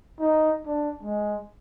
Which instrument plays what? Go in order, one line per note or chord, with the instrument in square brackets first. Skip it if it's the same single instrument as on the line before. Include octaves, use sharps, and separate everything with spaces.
[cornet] D#4
D4
G#3